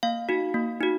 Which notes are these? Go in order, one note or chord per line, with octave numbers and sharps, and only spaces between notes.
A#3 F5
D#4 F#4
A#3
D#4 F#4